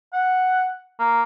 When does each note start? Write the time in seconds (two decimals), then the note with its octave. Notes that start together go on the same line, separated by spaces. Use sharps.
0.13 F#5
0.99 A#3